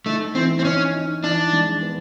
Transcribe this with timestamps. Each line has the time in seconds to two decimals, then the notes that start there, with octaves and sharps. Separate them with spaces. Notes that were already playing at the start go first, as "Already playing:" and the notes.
0.06 A3 D#4
0.35 E3 C4
0.59 C4
0.65 C#4 D#4
0.94 D#4
1.23 E3 D4
1.53 G#3
1.82 B3